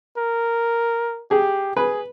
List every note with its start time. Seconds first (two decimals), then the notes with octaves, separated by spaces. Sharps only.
0.17 A#4
1.31 G4 G#4
1.77 G#4 B4